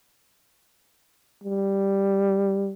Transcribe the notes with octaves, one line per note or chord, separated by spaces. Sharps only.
G3